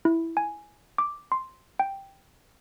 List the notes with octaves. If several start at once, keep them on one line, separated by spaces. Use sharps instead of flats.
E4
G#5
D6
C6
G5